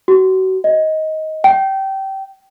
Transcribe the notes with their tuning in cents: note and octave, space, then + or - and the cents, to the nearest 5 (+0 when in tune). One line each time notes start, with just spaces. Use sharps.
F#4 +30
D#5 +15
G5 -20